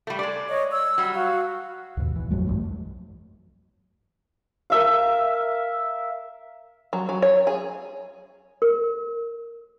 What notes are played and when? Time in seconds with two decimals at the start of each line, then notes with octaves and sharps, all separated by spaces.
0.07 G3 A3
0.19 G#3 D5
0.49 C#5 D#5
0.71 E6
0.98 F#3 G3
1.14 F#4 F5
1.97 D#2 G#2 B2
2.16 E2 E3
2.30 A1 F2 F#3 G#3
2.46 B1 G2 E3 A3
4.70 A#4 E5 F5
6.93 F#3
7.09 F#3
7.22 C#5
7.47 G#4
8.62 A#4